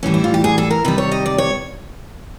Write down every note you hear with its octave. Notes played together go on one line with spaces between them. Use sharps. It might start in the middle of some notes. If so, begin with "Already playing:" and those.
A2 E3 G3 C#4
E4
F4
G4
G#4
A4
A#4
C3 D#3 G3 B4
C#5
D#5
D5
C#5